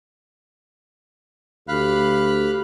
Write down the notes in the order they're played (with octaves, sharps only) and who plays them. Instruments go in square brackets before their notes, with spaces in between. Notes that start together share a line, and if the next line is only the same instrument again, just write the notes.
[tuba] D2 [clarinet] G4 [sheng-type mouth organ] F5 B5 F#6